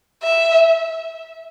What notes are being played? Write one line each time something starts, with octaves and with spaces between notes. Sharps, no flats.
E5